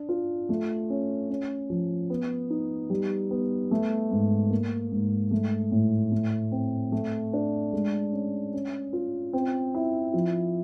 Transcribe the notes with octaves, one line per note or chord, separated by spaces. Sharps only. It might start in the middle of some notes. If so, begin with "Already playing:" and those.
Already playing: D4
F4
A3
C#4
C#4
F3
B3
D#4
G3
B3
A3
G#2
A#3
G#2
A3
A2
A3
C4
A3
D4
G#3
C#4
C#4
F4
C4
E4
F3